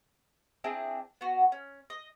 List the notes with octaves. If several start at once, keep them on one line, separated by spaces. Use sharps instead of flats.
C4 D4 E4 G#4
B3 F#4
C#4
D#5